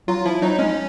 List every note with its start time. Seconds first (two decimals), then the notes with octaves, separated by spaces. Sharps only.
0.08 F#3 F4
0.25 F3 E4
0.42 F#3 D#4
0.59 G#3 C#4